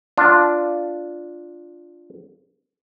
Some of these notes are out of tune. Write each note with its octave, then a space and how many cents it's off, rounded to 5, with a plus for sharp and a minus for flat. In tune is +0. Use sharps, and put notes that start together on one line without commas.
D4 +0 F4 +0